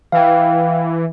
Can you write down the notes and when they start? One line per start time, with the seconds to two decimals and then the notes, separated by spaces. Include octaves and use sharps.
0.12 E3 F5 G5